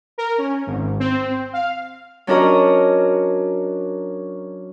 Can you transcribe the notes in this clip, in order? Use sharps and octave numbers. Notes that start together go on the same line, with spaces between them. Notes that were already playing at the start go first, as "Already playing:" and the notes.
A#4
C#4
G#1
C4
F5
F#3 C#4 D4 F#4 A#4 D#5